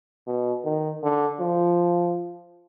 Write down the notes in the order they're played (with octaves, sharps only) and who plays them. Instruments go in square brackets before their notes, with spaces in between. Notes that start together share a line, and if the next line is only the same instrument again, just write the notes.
[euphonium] B2
D#3
D3
F3